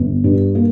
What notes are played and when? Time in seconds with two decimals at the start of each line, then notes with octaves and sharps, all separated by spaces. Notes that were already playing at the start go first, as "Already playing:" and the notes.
Already playing: G1
0.24 G2
0.55 A#3